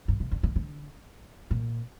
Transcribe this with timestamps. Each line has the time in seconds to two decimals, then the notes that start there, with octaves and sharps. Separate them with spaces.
0.08 G2
0.20 C3
0.32 D3
0.43 D3
0.56 D3
1.51 A#2